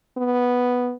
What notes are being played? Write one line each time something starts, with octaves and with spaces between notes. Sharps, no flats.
B3